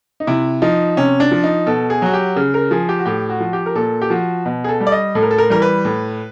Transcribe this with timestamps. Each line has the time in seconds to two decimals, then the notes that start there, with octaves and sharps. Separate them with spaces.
0.20 D#4
0.27 C3 E4
0.62 F3 D#4
0.97 C3 C#4
1.20 D4
1.31 F3
1.43 D#4
1.67 B2 A4
1.90 G#4
2.02 F#3 F#4
2.13 G4
2.36 C#3
2.54 A#4
2.71 F3 G#4
2.89 G4
2.99 F#4
3.05 A2 G4
3.30 F#4
3.40 F3
3.53 G4
3.66 A#4
3.76 A#2 A4
4.01 G4
4.10 F3 F#4
4.46 B2
4.64 G#4
4.69 A4
4.81 G3
4.87 D5
4.92 D#5
5.15 A2 A4
5.22 A#4
5.31 A4
5.38 A#4
5.50 E3 G3 A#4
5.62 B4
5.85 A2